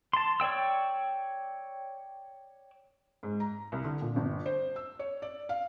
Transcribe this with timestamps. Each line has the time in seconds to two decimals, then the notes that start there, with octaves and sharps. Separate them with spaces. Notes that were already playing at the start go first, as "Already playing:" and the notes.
0.13 A5 C6
0.40 C#5 D5 G5 E6
3.23 G#2
3.40 A#5
3.72 C2
3.84 D3
4.01 A#2
4.16 G1
4.46 C5
4.76 E6
4.99 C#5
5.22 D5
5.49 F5